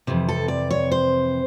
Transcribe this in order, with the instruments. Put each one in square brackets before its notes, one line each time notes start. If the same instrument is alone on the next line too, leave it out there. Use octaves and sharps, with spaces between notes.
[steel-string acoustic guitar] F2 C3 E3
A4
D5
C#5
C5